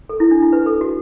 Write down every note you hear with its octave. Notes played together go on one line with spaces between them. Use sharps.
A4
E4
D4
E4
B4
A4
F#4